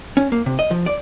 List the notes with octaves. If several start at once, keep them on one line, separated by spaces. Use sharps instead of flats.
C#4
A#3
C3
D#5
F3
D5